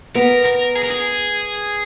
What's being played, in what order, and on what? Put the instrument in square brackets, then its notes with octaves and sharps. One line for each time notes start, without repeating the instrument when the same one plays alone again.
[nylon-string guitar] B3 [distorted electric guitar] A#4
[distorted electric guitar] A#4
G#4
A#4
G#4